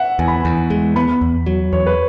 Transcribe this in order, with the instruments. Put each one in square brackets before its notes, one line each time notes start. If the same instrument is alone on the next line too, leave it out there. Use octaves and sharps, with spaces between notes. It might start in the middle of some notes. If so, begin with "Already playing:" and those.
Already playing: [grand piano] E5 F#5
[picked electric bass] E2 [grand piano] G#5
[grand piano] B5
G#5
[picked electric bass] E2
G#3
[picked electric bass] B3 [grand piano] B5
[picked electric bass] E2
F#3
[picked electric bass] E2 [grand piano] C#5
[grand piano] B4